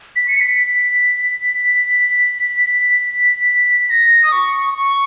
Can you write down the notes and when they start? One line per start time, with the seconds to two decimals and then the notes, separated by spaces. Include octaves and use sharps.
0.16 B6
0.28 C#7
0.40 B6
0.58 B6
3.90 A#6
4.24 D#6
4.32 C#6
4.74 C#6